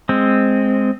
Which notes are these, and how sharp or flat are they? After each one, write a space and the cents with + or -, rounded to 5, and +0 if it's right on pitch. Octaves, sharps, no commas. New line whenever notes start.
G#3 +0 C4 +0